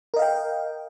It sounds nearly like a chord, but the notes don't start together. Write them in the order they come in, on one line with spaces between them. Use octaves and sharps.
A#4 D#5 F5 G5